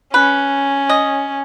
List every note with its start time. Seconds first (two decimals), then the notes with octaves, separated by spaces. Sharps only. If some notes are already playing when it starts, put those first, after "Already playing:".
0.14 C#4 B4
0.89 D#5